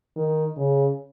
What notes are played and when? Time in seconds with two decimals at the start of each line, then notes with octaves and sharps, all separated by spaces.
0.16 D#3
0.57 C#3